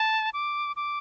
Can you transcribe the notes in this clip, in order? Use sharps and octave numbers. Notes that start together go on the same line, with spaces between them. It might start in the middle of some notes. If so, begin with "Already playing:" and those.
Already playing: A5
D6
D6